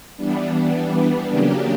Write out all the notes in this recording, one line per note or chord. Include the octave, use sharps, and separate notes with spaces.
E3 G3 B3 D4
C#3 F#3 A#3 D4 G4